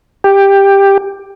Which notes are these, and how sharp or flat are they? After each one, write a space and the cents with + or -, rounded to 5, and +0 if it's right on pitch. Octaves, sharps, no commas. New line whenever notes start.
G4 +10